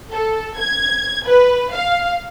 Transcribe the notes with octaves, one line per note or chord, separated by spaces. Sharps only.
A4
G#6
B4
F5